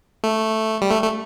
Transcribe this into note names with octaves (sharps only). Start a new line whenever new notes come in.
A3
G3
A3
A3